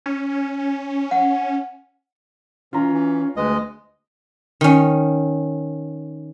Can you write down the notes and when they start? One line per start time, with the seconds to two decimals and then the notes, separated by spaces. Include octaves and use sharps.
0.06 C#4
1.11 F#5
2.73 E3 C#4 F4 A#5
2.93 E3
3.36 D2 G#3 B4 D#5
4.61 D#3 C#4